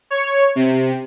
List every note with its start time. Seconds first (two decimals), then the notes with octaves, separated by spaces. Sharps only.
0.10 C#5
0.55 C3